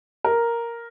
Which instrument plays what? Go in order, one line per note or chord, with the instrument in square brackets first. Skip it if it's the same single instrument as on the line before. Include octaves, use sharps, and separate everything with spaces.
[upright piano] A#4